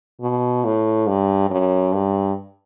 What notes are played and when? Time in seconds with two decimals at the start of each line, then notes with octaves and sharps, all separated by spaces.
0.21 B2
0.65 A2
1.08 G2
1.50 F#2
1.93 G2